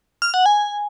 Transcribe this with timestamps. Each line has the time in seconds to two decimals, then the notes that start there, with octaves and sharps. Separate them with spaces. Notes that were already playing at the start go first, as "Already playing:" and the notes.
0.22 F6
0.34 F#5
0.46 G#5